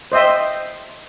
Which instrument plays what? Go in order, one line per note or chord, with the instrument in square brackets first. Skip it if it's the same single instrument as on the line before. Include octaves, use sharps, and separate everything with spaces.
[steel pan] C5 D#5 E5 G5